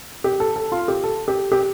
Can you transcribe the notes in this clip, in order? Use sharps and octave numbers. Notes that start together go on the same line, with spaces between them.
G4
A4
A4
F4
G4
A4
G4
G4